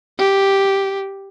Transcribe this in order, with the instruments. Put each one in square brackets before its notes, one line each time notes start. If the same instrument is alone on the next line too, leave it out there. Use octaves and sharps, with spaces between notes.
[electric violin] G4